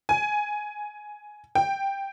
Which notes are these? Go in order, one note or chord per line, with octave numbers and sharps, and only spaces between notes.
G#5
G5